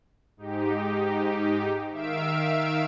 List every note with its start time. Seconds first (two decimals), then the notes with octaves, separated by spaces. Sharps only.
0.37 G#2 D#4 G4
1.91 D#3 E5 F5 E6 D7